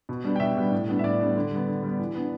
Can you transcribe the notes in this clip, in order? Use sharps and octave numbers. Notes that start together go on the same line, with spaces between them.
B2
G3 B3 D4
G5
B2 E5
G3 B3 D4
A2
G3 B3 D4
E5
A2 D5
G3 B3 D4
D3
G3 B3
D3
G3 B3
E3
B3 D4